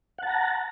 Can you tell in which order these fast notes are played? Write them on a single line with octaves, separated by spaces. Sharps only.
F#5 A5 A#5